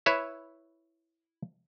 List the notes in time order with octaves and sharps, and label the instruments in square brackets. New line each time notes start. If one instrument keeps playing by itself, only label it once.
[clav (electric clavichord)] E4 B4 C#5 E5